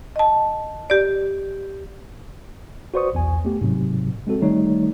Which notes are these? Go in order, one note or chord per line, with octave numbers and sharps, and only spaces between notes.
D#5 A5
G4 D5
F#4 B4 C5 D5 C#6 D#6
B1 E2 G#5
A3 B3 G4
G#2 C3 F#3
G#3 C4 F#4 A4
D#3 G3 A3 D#4 C#5